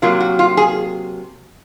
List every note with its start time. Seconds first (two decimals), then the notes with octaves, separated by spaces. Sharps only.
0.02 C3 F#3 A#3 F4
0.20 F#4
0.39 F4
0.57 G#4